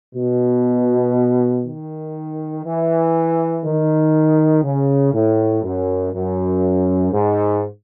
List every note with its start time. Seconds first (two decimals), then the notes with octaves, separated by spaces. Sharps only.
0.15 B2
1.65 D#3
2.65 E3
3.64 D#3
4.64 C#3
5.13 A2
5.63 F#2
6.13 F#2
7.13 G#2